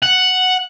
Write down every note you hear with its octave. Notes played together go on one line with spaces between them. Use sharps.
F#5